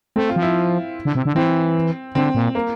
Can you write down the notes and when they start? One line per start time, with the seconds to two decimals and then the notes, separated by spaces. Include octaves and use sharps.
0.16 A3 C4
0.29 F4
0.36 F3
0.42 E4
1.05 D3
1.15 C3
1.25 D3
1.35 E3 C4
2.15 D3 C4
2.35 A#2
2.55 A#3